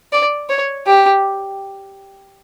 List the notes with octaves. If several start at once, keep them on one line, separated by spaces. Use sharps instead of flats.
D5
C#5
G4